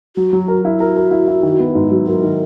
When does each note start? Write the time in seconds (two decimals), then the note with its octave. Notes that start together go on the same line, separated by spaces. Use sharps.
0.16 F#3 F#4
0.33 F#3
0.48 A#4
0.65 E4
0.80 F#4 A#4
0.96 A#4
1.11 E4
1.28 E4
1.43 D#3
1.60 B3
1.75 G#2
1.90 F#3
2.07 F#3 A#4
2.23 D#3